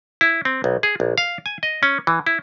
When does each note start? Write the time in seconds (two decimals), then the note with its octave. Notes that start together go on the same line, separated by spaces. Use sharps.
0.21 E4
0.45 C4
0.64 B1
0.83 G#4
1.00 A#1
1.18 F5
1.46 G#5
1.63 D#5
1.83 C#4
2.07 E3
2.27 E4